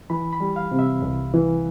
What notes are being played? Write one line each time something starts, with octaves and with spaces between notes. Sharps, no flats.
E3 B5
B5
G3
F5
C3
E5
C2
E3